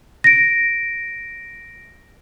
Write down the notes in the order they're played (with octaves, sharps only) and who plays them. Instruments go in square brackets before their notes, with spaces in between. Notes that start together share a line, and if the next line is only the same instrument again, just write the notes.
[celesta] A#6 D7